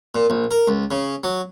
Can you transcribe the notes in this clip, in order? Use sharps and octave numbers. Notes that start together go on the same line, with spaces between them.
A#2
A#1
A#4
C#2
C#3
F#3